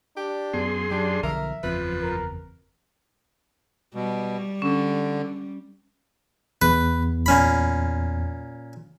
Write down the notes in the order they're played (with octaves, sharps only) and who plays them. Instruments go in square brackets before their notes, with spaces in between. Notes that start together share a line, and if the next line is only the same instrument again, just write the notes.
[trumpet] D4 [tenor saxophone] G4
[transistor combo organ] F#2 G#4 C6 [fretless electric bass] B3
[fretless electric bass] F#3 [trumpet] D4 [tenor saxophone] G4
[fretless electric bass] B1 D3 F3 [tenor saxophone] A#4 [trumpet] E5
[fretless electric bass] F#1 E2 C4 [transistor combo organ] F3 [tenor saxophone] B4
[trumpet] A#4
[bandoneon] B2 [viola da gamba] G3
[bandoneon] D3 [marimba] C#4
[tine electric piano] E2 [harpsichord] B4
[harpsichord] A#2 C#4 B5